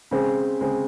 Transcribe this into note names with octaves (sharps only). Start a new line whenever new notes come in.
C#3 G#3 C4
C#3 G#3 C4